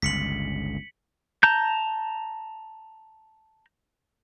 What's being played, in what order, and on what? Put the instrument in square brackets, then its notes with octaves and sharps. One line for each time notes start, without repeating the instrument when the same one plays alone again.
[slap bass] G1 C#2 [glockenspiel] B6 C#7 F#7
[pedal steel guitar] A5 A#5 G6